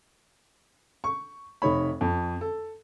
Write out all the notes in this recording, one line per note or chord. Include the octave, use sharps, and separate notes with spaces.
C#6
F1 D#4 C#5 B5
F2
A4